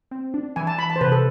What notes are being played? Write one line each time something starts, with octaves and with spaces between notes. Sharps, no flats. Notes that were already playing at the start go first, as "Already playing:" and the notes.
C4
D4
E3 G#5
A5
E3 B5
A5
C5
C3 B4
A4